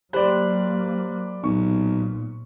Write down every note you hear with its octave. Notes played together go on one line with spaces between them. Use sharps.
F#3 A#3 G4 C5 D5 B5 F#6
B1 A#2 C#6